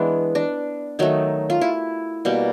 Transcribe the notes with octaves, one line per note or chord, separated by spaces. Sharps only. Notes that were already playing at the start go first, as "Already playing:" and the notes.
Already playing: E3 G#3 B3 D4
D4
D#3 F#3 A3 D#4
F4
E4
B2 G3 A#3